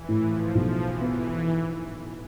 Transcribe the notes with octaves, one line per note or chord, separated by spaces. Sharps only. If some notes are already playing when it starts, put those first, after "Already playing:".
Already playing: E3
A2
F3
B1 F3
E3
B3
E3